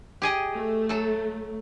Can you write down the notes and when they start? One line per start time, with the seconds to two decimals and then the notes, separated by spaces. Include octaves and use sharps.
0.22 G4 G#4 D#5
0.54 A3
0.89 F#3 A4